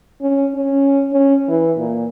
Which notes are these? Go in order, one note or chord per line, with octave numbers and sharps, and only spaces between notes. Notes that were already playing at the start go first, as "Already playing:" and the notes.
C#4
C#4
C#4
E3
A#2